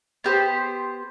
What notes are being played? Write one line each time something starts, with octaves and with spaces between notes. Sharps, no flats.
B3 G4 C5